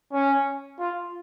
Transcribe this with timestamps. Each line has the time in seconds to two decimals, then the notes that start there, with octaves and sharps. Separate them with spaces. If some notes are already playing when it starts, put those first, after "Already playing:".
0.12 C#4
0.79 F4